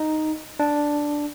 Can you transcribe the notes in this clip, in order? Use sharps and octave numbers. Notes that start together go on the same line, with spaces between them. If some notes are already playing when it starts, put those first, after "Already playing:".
Already playing: D#4
D4